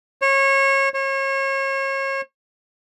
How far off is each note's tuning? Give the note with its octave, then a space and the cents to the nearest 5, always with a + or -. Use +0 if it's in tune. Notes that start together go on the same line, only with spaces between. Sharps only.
C#5 -25
C#5 -35